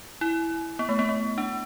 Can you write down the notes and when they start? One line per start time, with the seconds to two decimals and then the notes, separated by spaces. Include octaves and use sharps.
0.21 E4
0.79 B3
0.89 A3
0.99 B3
1.09 B3
1.38 D4